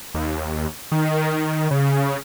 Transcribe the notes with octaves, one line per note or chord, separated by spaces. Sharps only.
D#2
D#3
C#3